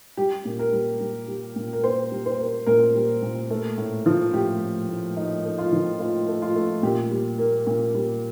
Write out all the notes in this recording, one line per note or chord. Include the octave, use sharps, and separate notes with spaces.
G3 G4
A#2
A#4
G3
G3
G3
A#2
A#4
A#3 C5
G3
C5
A#3
A#2 A#4
G3
A#2
A3
A2
F3
A2 G4
A2
A2
A2 D#4
A3
F4
F3
A3 F4
A3
F4
A3
A#2 G4
G3
A#3
A#2
G3